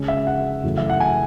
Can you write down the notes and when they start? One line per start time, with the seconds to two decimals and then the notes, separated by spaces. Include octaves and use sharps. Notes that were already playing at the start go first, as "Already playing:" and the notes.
Already playing: C#3 G#3 C#4
0.08 E5
0.27 F#5
0.63 F#2 C#3 E3 A3 E4
0.78 E5
0.90 F#5
1.00 G#5